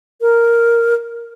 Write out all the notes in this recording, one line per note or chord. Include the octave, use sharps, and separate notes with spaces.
A#4